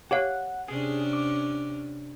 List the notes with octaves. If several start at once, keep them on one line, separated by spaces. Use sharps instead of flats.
G4 C#5 F5 F#5 F#6
C3 C#4 D4 G#4
D6